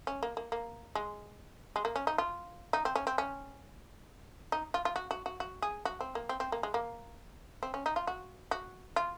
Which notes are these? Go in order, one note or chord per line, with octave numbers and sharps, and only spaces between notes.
C#4
A#3
A#3
A#3
G#3
G#3
A#3
C#4
D#4
F4
D#4
C4
C#4
C4
C#4
D#4
F4
F4
F#4
F#4
F#4
F#4
G#4
F#4
C4
A#3
C4
C4
A#3
G#3
A#3
C4
C#4
D#4
F4
F#4
F#4
F4